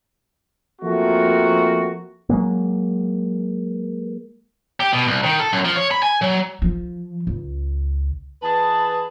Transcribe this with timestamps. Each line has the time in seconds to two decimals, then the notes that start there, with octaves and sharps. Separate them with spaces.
0.82 F3 A3 A#3 C4 F#4
2.29 F#3 G#3 A#3
4.80 G4
4.93 B2
5.08 C2
5.24 D#3
5.40 A4
5.53 F#2
5.65 F3
5.76 C#5
5.91 B5
6.03 G#5
6.22 F#3
6.62 F3
7.27 C#2
8.42 E3 G#4 B4 A5